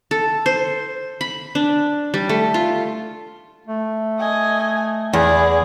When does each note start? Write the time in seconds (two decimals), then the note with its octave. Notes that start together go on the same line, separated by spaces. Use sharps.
0.11 A4
0.46 C5
1.21 B5
1.55 D4
2.14 G3
2.29 A3
2.54 F4
3.67 A3
4.20 D#5 G#5
5.13 E2 G#4 D5